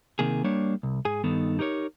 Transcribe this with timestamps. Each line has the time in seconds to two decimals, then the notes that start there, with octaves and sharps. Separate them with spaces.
0.19 C3 D#3 A#3 G#4
0.44 G3 A#3 D4 C#5
0.83 C2
1.05 G#2 G#4 G#5
1.24 G2 D#3 B3 D#4 A4
1.59 D#4 G4 A#4 C5 C#5